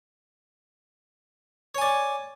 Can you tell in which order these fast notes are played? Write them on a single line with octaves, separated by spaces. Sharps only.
C#5 G#5 D5